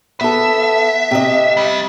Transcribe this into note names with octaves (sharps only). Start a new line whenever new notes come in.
B3 A4 E5
C3 D#5
G3 C4